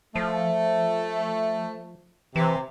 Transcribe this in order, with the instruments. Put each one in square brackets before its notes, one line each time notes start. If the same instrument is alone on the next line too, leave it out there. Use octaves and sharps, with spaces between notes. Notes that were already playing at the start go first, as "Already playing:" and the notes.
[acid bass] F3 [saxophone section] A3
[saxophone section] C3 [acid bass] E3